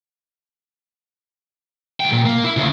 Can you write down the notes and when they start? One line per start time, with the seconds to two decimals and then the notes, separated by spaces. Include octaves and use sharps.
2.00 C#2 G5
2.12 A#2
2.26 A#3
2.44 E4
2.57 D2 C#3